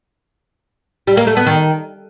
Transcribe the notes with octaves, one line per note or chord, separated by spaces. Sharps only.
G3
A#3
A3
B3
D#3